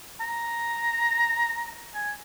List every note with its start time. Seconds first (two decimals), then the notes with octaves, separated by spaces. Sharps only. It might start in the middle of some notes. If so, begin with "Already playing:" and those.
0.20 A#5
1.94 G#5